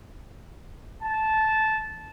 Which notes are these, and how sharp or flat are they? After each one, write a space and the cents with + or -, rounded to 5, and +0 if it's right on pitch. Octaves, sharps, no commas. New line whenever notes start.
A5 -10